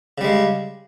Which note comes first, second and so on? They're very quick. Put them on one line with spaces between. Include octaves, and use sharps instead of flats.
C#3 G3 G#3